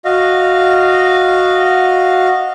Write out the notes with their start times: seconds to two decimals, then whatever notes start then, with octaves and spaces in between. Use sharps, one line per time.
0.05 F#4 D#5 F5